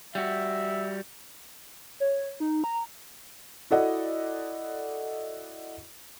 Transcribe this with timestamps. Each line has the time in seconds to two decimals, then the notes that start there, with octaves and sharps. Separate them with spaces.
0.15 G3 F#4 E5
2.00 C#5
2.40 D#4
2.64 A#5
3.70 E4 F#4 A4 D5 D#5 F#5